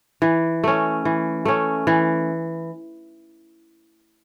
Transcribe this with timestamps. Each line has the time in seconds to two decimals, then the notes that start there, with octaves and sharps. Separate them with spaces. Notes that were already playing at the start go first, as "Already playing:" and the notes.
0.22 E3
0.64 A3 C#4
1.05 E3
1.45 A3 C#4
1.87 E3